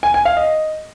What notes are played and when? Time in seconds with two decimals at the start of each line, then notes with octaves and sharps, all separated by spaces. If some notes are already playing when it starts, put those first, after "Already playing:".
0.03 G#5
0.14 G#5
0.25 F5
0.37 D#5